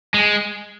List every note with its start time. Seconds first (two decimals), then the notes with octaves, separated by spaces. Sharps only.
0.14 G#3